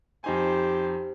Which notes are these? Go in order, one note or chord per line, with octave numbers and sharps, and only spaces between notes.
F2 D#4 G4 C5 G#5